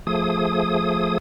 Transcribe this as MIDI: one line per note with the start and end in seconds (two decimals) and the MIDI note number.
0.07 1.18 53
0.07 1.18 57
0.07 1.18 68
0.07 1.18 87